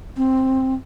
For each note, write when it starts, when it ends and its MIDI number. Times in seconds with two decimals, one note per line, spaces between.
0.17 0.74 60